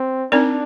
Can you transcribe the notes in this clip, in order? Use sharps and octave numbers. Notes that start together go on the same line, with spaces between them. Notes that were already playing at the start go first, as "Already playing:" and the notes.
Already playing: C4
C4 D4 D#4 A#4 D5